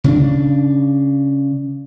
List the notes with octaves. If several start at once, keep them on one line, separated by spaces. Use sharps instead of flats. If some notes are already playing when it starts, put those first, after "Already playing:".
C#3 C4 D4